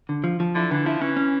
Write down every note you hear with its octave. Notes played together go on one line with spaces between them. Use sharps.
D3
F3
F3
D3 E4
D3 E3
F3 E4
E3 C#4
C#4